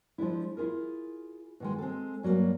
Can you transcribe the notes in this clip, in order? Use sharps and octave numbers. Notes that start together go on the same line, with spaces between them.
F3 G#3 D4 E4
E4 F4 G#4 A#4
B2 D#3 G#3
G#3 C4 G#4 A4
G2 F#3 G3 A#3